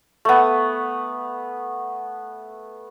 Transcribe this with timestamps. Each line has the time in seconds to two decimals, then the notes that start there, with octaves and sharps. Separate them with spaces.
0.25 A3 B3